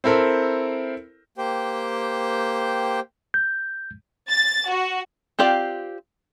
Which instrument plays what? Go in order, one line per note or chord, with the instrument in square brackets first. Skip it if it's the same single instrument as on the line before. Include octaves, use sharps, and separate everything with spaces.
[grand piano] C4 E4 A4 A#4 C5
[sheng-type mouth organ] A#3 G4 C5 G5
[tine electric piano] G6
[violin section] A6
F#4
[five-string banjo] C4 F4 G4 D5 F5